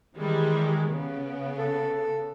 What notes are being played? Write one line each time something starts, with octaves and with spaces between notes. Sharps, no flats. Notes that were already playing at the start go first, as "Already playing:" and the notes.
D#3 E3 G3 G#3
C#3 B3
A4